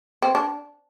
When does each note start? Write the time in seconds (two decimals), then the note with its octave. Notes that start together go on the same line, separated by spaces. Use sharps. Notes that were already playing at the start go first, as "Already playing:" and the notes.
0.22 C4
0.35 D4